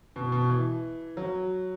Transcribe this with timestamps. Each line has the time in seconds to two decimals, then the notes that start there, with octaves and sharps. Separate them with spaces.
0.16 B2
0.32 B2
0.49 E3
1.17 F#3